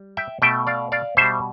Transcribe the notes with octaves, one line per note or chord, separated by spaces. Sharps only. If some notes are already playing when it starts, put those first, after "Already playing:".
Already playing: G3
E5 G5
B2 A3 E5 G5
D5 F5
D5 F5
B2 G3 C5 E5